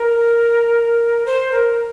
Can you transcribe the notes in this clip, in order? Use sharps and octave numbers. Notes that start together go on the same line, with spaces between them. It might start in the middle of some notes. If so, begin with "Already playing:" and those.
Already playing: A#4
C5
A#4